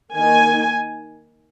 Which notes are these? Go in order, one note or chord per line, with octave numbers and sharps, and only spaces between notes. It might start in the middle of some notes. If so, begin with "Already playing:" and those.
D#3 A#3 D#4 G#5